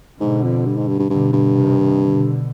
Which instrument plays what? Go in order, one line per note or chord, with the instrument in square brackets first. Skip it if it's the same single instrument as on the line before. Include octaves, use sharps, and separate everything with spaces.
[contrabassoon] G#2 [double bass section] B2 D3
[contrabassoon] F2
G2
G#2
G2
G2
[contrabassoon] G2 [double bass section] B2 D3
[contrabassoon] G2
[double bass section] C3 D#3
B2 D3